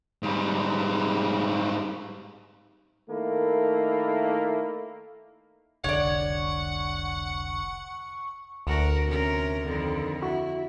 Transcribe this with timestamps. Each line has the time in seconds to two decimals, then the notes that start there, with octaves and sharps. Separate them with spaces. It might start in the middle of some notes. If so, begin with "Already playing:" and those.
0.23 G#2 G3
3.10 D#3 A3 A#3 E4
5.84 F1 C2 D3 C#5 D5 F#5 C#6
8.67 D2 F#4 A#4
9.06 C3 C#4 A#4
9.64 F2 D3 D#3
10.22 E4 F#4